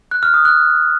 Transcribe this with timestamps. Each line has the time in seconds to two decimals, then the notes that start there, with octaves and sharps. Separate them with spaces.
0.11 F#6
0.23 F6
0.34 D#6
0.45 F#6